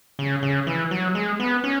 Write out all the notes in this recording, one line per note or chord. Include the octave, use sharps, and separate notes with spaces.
C#3
C#3
E3
F#3
G#3
B3
C#4